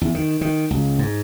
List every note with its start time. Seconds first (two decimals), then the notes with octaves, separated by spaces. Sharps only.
0.01 E2
0.15 D#3
0.41 D#3
0.71 C#2
0.99 G#2